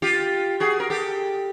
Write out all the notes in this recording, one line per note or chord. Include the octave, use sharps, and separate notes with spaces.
F4 G4
F#4 G#4
A#4
G4 A4